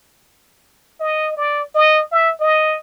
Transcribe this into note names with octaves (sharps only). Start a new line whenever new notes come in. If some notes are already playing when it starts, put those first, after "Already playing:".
D#5
D5
D#5
E5
D#5